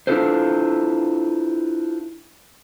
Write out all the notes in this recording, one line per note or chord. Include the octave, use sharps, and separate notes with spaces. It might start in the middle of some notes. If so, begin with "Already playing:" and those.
D4 E4 F4 A4 B4 C5